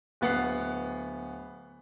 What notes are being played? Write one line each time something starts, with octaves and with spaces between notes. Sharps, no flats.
D1 B3 F#5 C7